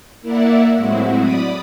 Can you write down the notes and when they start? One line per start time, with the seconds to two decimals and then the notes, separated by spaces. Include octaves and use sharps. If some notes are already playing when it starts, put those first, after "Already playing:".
0.22 A#3 E4 A#4 D5 E5 F#5
0.76 A2 F#3 G#3 C4 E4 F#4
1.19 D5 B5 D#6